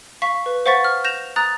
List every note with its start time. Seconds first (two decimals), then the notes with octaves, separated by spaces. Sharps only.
0.22 F5 C#6 B6
0.46 B4
0.66 C5 F5 F#5 C#6 A6 B6
0.84 F6
1.04 G6 A#6 E7 F7
1.36 A#5 D#6 F#6 A6